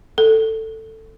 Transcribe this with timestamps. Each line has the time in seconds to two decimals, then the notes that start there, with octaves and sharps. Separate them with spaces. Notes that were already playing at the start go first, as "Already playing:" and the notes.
0.18 A4